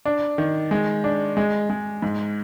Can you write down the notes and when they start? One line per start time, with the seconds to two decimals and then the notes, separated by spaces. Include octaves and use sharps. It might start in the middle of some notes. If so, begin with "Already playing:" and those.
0.05 D4
0.38 D#3
0.71 G#3
1.04 D4
1.37 G#3
1.70 G#3
2.02 G#2